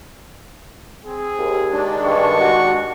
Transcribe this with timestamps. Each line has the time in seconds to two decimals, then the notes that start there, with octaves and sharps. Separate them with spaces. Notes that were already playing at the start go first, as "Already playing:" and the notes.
1.06 C4 G#4
1.38 D#2
1.71 D#3 G#3 D4
2.05 G2 C#6
2.40 F#4